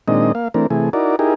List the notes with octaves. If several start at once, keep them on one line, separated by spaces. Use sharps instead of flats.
A#2 D#3 G#3 C4 D4 D#5
A#3 F5
E3 A3 C4 D4 A#4
C3 E3 A3 G#4
D#4 E4 F#4 A#4 D5
D#4 E4 G4 G#4 A#4